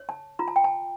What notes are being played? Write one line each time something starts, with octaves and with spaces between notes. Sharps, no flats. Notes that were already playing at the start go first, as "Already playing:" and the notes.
Already playing: C#5
A5
F4 A#5
A5
G5
A5